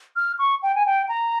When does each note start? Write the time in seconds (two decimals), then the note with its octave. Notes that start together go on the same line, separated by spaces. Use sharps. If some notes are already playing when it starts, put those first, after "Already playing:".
0.16 F6
0.39 C#6
0.63 G5
0.75 G#5
0.86 G5
1.09 A#5